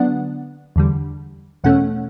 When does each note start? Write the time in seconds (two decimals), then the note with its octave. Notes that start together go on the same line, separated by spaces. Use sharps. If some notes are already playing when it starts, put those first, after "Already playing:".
Already playing: D3 F#3 B3 D4 F#5
0.76 E2 D3 G3
1.64 E2 B2 A3 C#4 F#5